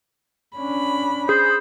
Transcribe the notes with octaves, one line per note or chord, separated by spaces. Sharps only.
C#4 D4 B5
G#4 C5